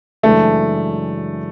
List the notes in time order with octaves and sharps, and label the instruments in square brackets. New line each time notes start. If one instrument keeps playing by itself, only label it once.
[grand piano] F#2 C#3 E3 G#3 D4 [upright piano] A3